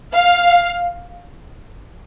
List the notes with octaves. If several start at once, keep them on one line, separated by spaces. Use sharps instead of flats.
F5